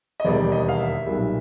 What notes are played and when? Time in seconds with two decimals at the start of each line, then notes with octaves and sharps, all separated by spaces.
0.20 D#5
0.25 E1 D#2 D#3 G3 D5
0.52 D#5
0.69 F5
0.79 E5
1.06 B1 A#2 G3